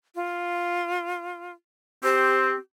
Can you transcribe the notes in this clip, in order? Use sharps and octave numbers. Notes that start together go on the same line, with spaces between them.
F4
C4 G4 C5